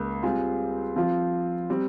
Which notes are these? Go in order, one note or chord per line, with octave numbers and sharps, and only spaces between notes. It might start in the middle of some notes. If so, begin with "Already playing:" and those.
Already playing: C#2 A#3
G3 C4 F4 G#4
F3 C4 F4
G3 C4